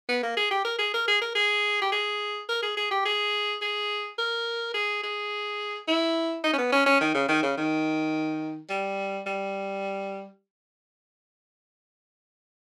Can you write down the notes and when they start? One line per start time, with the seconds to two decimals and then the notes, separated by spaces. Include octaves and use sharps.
0.09 B3
0.23 A#3
0.37 G#4
0.51 G4
0.65 A#4
0.79 G#4
0.94 A#4
1.08 G#4
1.21 A#4
1.35 G#4
1.81 G4
1.92 G#4
2.49 A#4
2.62 G#4
2.77 G#4
2.91 G4
3.05 G#4
3.62 G#4
4.18 A#4
4.74 G#4
5.03 G#4
5.88 E4
6.44 D#4
6.53 C#4
6.58 B3
6.72 C#4
6.86 C#4
7.01 D#3
7.15 C#3
7.28 D#3
7.43 C#3
7.57 D#3
8.70 G3
9.26 G3